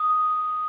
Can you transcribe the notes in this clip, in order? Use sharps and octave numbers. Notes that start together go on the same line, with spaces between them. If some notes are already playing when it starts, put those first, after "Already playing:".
Already playing: D#6